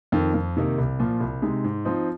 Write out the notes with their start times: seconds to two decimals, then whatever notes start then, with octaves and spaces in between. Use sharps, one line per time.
0.12 F2 D#3
0.34 F2
0.57 C3 D#3 A#3 D#4
0.78 C2
0.99 A#2 F3
1.20 C2
1.42 C3 G#3 D#4
1.64 G#2
1.85 F3 C4 D#4